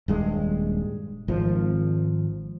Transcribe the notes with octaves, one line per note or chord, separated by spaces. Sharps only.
D#1 G2 G#3
G#1 F3